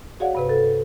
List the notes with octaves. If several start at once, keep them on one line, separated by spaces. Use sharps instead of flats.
F#4 G#4 C#5 D5 F5 F#5
G2 C3 B4
A4